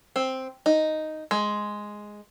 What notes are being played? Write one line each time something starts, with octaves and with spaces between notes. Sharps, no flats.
C4
D#4
G#3